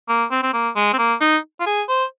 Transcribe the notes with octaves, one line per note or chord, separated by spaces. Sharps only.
A#3
C4
C4
A#3
G#3
C4
A#3
D#4
F4
G#4
C5